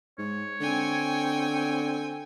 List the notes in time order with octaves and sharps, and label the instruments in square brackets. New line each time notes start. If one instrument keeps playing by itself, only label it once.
[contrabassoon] G#2 [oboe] C#5
[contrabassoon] D3 [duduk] C4 [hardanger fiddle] G5 G#5